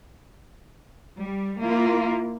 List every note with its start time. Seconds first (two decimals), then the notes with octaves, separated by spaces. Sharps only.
1.19 G3
1.64 A#3 E4 F4